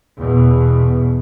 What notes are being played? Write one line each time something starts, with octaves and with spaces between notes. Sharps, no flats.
E2 B2